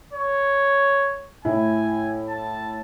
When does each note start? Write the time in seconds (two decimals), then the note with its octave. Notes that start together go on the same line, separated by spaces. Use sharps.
0.13 C#5
1.45 A2 E4 G#5
2.29 A5